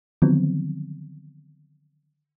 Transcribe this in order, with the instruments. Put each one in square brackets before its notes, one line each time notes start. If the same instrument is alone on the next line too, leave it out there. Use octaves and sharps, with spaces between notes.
[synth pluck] D3 D#3 F3 F#3 B3 C4